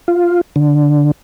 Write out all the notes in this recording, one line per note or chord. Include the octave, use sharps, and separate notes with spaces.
F4
D3